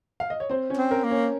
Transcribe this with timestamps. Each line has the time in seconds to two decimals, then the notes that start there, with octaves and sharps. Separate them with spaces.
0.20 F5
0.30 D#5
0.40 C#5
0.49 C4 C5
0.70 C#4 C#5
0.77 C4
0.91 A#4
1.04 A#3
1.11 C#4 C#5